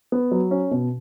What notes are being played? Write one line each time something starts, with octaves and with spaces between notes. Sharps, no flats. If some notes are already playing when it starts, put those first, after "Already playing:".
B3
F#3
C#4
B2